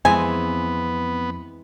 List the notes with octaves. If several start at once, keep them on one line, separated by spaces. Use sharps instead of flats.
F2 E3 G#3 B3 C4 G#5